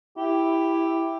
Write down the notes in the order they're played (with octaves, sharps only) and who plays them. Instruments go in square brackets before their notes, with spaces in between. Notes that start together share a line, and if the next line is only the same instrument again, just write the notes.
[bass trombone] E4 [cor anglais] G4